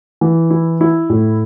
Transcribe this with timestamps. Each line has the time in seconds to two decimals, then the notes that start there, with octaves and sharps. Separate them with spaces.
0.21 E3
0.50 E4
0.81 E4
1.10 A2